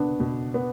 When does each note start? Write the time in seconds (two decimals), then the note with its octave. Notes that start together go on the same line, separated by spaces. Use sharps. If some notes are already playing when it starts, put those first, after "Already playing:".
Already playing: B2 B3 D4
0.20 B2
0.54 B3